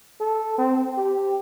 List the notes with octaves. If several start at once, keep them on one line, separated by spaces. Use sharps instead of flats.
A4
C4
G4